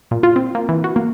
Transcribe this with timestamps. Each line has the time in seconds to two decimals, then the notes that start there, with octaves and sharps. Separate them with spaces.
0.11 A#2
0.23 F4
0.36 C4
0.55 A#3
0.69 E3
0.84 F#4
0.96 A#3